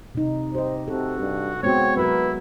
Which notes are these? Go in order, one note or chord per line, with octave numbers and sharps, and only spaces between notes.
C3 D#4
G4 C5 D#5
C3 F#4 A4
G2
G#3 B3 C4 F#4 C#5
F#3 E4 F#4 A#4 B4